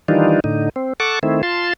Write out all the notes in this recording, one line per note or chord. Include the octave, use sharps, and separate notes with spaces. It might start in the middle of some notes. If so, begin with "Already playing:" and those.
D#3 E3 G3 D4 D#4 F4
A2 D3 D#4
C4
A4 F#5 A5 C#6 D6
D#3 A3 C4 E4
F4 A5 C6